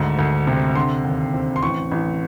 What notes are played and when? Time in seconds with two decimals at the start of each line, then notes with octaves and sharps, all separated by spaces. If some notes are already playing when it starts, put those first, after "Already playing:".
Already playing: D2 G#2 D#3
0.19 D2
0.47 C3
0.75 D3 C6
1.04 D#2
1.34 C4
1.56 C6
1.63 A1 C#6
1.91 A1